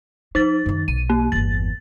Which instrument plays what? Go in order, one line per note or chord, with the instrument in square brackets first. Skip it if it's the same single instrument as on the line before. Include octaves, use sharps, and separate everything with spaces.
[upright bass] F3 [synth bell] D#4 A6
[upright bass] F#2 D#3
[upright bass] B1 [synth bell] D#7
[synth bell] A#3
[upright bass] G1 E2 [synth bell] A6